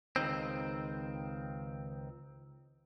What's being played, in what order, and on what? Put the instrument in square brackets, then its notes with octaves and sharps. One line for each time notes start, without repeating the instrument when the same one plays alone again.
[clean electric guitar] C#2 G2 D#3 C4